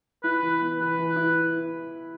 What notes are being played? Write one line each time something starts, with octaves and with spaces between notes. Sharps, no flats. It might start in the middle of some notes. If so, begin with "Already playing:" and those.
E4 B4
E3
B3
E3 B4
E3
E4